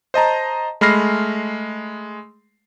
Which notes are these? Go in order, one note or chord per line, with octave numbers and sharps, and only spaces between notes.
C5 D#5 A5 A#5
G#3 A3 B5 F6 A#6 C7